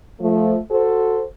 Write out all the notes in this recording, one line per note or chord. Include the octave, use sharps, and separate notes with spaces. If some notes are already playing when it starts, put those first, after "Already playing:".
F3 A3
F#4 A4 C5